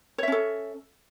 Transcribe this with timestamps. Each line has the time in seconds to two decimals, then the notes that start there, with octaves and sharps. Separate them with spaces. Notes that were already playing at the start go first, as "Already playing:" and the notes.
0.18 C#5
0.23 E5
0.28 C#4
0.32 A4